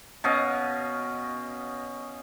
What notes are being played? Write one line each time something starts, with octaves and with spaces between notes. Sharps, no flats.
B2 C#4 D#5 F5